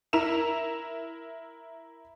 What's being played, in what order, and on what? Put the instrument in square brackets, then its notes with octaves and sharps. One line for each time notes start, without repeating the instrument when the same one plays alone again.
[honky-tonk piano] E4 A#4 E7 F7